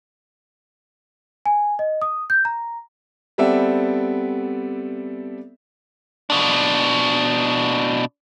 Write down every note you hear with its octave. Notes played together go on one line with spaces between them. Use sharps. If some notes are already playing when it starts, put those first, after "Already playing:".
G#5
D#5
D#6
G6
A#5
G3 B3 C4 A4 D5 E5
B2 D4